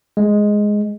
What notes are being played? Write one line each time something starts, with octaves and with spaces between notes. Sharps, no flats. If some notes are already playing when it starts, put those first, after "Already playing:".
G#3